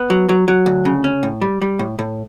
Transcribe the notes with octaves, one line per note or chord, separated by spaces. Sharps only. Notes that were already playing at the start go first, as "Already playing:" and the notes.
Already playing: B3
F#3
F#3
F#3
D2
C#3
C#4
A2
G3
G3
A2
A2